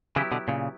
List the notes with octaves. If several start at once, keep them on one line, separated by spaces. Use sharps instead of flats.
C#3 E3 F#3 B3 E4 G4
B2 D3
A#2 C#3